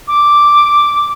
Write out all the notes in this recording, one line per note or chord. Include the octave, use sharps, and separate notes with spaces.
D6